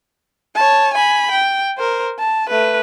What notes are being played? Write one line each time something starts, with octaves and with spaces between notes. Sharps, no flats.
C#5 A5
G#5 B5
G5
A#4 C5
A5
A3 B4